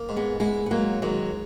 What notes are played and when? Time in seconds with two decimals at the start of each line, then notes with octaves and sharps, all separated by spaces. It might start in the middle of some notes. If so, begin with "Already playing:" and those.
Already playing: A#3
0.09 G#2
0.17 G#3 B3
0.40 G#3 B3 E4
0.66 B3
0.71 G#2 F#3 A#3
1.02 G#2 D#3 F#3